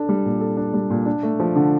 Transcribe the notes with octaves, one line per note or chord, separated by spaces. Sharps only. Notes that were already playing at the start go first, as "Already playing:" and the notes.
Already playing: D4 A4
G3
A#2
A4
D4
G3
A#2
D4
A3
F3
D3